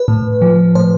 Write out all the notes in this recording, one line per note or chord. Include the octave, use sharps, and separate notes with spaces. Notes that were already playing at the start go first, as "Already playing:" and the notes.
Already playing: B4
A2
F3
A2 C5